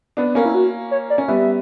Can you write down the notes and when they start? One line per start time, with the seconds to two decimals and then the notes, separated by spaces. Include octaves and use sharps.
0.17 B3 D4
0.35 A#3 C#4
0.45 E4
0.54 F#4
0.91 C#5
1.10 D5
1.18 C#4
1.28 G3 B3 E5